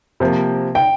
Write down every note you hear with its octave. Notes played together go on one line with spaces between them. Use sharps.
C3 F3 A#3
G5